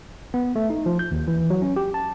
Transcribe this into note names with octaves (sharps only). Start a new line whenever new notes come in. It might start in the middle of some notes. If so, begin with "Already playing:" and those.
B3
A3
D#4
F3
G6
D#2
E3
F#3
C#4
G4
A5